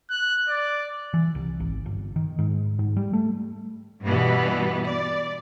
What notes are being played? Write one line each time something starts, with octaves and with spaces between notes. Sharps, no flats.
F#6
D5
E3
C2
G#1
G1
D#3
G#2
G#2
G3
A3
G2 B2 E3 G3 B3
D5